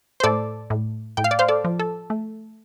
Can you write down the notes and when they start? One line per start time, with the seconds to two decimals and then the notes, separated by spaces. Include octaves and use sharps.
0.20 C5
0.23 A2 A4 D5
0.70 A2
1.17 A2 G5
1.24 F5
1.31 D5
1.39 C5 F5
1.49 A4 D5
1.65 F3
1.79 A4
2.10 A3